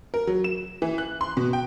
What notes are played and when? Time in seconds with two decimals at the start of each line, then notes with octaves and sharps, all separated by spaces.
0.14 A#4
0.27 F#3
0.44 E7
0.82 E3
0.98 F#6
1.21 C6
1.37 B2
1.53 G5